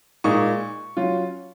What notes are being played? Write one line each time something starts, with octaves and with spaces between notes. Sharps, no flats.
A#2 G#3 D#4 C#6
F#3 C#4 F4